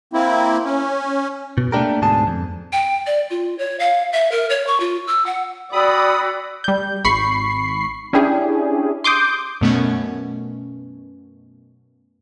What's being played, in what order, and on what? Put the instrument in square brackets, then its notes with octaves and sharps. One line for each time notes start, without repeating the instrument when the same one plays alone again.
[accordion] A#3 C4 E4
C#4
[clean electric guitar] B2
A3 A#3 C4 D4 G4 A#4
D2 G#2 B2 D4 G#4 A5
F2
[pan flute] G5
D5
F4
C#5
F5
E5
A#4
C#5
C#6
F4
E6
F#5
[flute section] F#4 G5 E6 [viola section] D5 [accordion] B5 D#6
[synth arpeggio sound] G3 G6
G#1 B5 C#6 C7
C#4 D4 E4 G4 G#4
C6 D6 D#6 G6
[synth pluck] F#2 B2 A3 B3 C#4